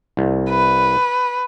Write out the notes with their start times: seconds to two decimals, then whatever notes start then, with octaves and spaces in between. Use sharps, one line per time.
0.17 C2
0.50 B4